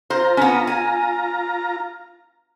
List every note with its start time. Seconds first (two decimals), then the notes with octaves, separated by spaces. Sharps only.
0.10 F4 C5 A#5
0.37 B3 C#4
0.67 G#5